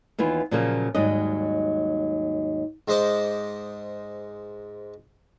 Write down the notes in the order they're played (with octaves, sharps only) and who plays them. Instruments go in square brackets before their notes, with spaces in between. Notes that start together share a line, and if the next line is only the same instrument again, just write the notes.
[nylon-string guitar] D#2 E3 B3 F4
A#2 C#3 F3 F#3 A#3
D#2 G#2 F#3 G3 D#5
[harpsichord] G#2 G#3 C5 D#5 D6